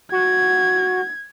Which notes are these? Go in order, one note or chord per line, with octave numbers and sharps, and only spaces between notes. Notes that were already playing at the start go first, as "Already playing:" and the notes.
F#4 G#6